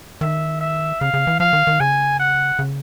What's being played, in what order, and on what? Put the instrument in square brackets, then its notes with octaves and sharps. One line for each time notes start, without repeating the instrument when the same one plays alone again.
[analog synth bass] D#3 [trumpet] E5
[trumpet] E5
[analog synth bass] C#3 [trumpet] F5
[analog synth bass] C#3
E3
[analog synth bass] F3 [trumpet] F5
[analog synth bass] D#3
D#3
[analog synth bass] C#3 [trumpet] G#5
[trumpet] F#5
[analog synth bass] C#3